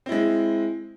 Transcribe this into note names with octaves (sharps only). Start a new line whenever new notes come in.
G#3 C4 E4